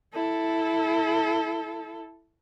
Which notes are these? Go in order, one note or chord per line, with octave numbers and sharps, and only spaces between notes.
E4 A4